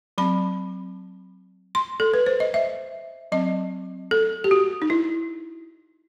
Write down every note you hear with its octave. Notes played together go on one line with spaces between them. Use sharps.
F#3 C4 B5
C6
A4
B4
C5
D#5
E5
F#3 C4 D#5
A4
G4
F#4
D#4
E4